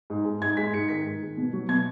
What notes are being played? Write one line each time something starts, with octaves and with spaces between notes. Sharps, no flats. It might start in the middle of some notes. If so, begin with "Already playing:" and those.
G#2
G#3
G#2 G#6
G#3 B6
G#2 C#7
D#3 G#3 B6
G#2
D#3 G#3
B2
F#3
B2 G#6